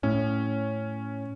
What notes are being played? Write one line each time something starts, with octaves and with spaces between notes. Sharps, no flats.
A2 C#4